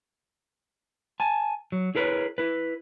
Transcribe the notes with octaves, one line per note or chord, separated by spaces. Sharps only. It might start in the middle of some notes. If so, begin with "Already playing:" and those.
G#5 A5
F#3
E4 G#4 A#4 B4 C#5
E4 B4